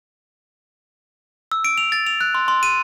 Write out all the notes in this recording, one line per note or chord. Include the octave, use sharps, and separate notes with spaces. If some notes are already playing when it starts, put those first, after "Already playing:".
E6
D7
F7
A6
F7
F#6
C6
C6
D#7